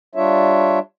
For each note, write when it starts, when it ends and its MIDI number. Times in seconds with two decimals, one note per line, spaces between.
0.15 0.79 55
0.15 0.79 62
0.15 0.79 65
0.15 0.79 73
0.15 0.79 76